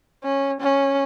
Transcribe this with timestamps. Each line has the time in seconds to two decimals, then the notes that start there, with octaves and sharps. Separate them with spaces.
0.24 C#4
0.61 C#4